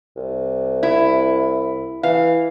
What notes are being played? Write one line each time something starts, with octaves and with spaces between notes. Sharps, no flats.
C2
E4
E3 F5